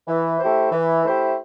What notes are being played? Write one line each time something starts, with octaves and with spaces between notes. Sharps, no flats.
E3
A3 E4 G4 C5
E3
A3 E4 G4 C5